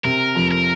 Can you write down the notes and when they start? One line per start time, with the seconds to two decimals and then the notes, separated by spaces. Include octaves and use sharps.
0.04 C3 A#4
0.35 F2
0.51 A#4